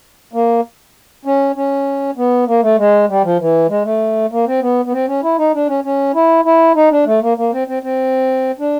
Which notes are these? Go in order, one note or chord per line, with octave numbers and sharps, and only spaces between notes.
A#3
C#4
C#4
B3
A#3
A3
G#3
G3
F3
E3
G#3
A3
A#3
C4
B3
B3
C4
C#4
E4
D#4
D4
C#4
C#4
E4
E4
D#4
D4
A3
A#3
A#3
C4
C4
C4
D4